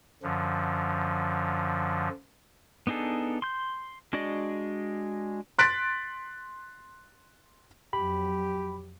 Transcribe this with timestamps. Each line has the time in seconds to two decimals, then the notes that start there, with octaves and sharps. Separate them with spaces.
0.23 F#2 D3 F3
2.87 B3 D4 D#4 G#4 A4
3.42 C6 G6
4.13 G#3 D4 F#4 D5 D#5
5.59 C6 F#6 A6 B6 D7
7.93 F2 F#3 G4 B5